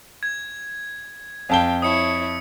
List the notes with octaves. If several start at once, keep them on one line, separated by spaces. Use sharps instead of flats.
G#6
F2 F5 G5 A5 G7
E4 C#5 D#6 C#7